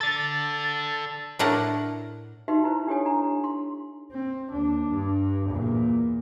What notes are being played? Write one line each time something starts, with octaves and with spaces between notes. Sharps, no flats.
A4 D5 A6
A2 A3 D4 E4 A#4 F#5
D#4 F#4 G4 B4 E5 C6
E4 B4 C5
D4 G4 A4 C#5 G#5
D4 A#5
C6
C4
D#2 D4
G2
E2 A#2